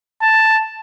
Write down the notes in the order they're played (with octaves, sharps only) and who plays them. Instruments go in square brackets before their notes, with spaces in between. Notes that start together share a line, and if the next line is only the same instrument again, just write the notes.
[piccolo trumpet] A5